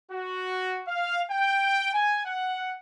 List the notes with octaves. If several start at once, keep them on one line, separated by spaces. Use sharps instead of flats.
F#4
F5
G5
G#5
F#5